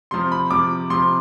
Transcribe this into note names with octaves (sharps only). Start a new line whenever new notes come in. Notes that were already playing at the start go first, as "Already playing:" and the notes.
C3 F3 C6
B5
C3 F3 D6
C3 F3 C6